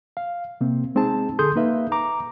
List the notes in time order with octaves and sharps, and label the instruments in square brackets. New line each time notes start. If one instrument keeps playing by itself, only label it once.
[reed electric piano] F5
C3 A#3 C4
G#3 C4 D#4 G#4 A5
D3 G#4 A4 C6 D#6 G6
A#3 D#4 B4 E5 F5
A#5 D6